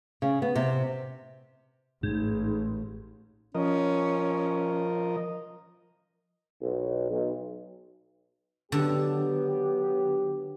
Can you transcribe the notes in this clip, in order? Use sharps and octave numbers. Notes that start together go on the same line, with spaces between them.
C#3
B3
C3
A1 G#2
F3 C#4 A#4 D#5
B1
B1
D3 F#3 B3 G4